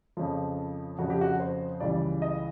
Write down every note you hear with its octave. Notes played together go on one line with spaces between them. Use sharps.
F2 C#3 F3
F2 C#3 F3 F#4
G4
F#4
C5
C#2 C#3 E3 G3 D5
D#5